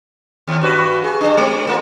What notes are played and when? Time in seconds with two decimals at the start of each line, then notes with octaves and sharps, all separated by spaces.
0.47 D#2
0.61 G2 F#4 B4
1.04 G#4
1.21 G2 D4
1.37 G#3 C4
1.67 A#3 D#4 F4